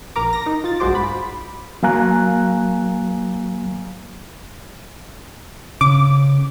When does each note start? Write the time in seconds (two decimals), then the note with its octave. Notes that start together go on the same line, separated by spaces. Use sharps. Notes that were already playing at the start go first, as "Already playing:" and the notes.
0.16 A#1 A#4 A#5 D6
0.33 A#6
0.46 D#4
0.64 F4 A6
0.80 B1 G2 G#3 F#4 C5 D6
0.95 B5
1.83 F#3 A#3 F5 G#5 A#5 F#6
5.81 C#3 D6